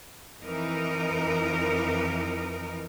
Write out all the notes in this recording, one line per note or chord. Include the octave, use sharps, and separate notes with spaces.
F2 E3 D#4 A#4